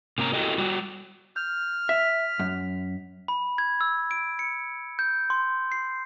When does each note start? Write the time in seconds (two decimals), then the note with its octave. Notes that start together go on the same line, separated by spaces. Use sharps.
0.18 C3 A#3 C#4 A#5
0.34 E4 F#4 G4 A4 D#5
0.58 G3 F#4
1.36 F6 G6
1.89 E5 B6
2.39 F#2
3.28 B5
3.58 G#6
3.81 E6
4.11 D7
4.39 C#7
4.99 G6
5.30 C6
5.72 C7